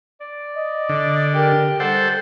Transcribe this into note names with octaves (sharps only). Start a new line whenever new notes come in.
D5
D#5
D3
G4 A#4
G3 A4 C5 F#5